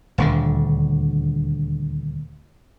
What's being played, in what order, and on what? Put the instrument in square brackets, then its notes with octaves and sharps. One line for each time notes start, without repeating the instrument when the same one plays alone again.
[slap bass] D#1 D2 D3